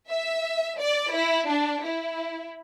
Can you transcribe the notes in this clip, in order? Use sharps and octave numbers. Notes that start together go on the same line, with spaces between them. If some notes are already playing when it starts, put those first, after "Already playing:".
E5
D5
E4
D4
E4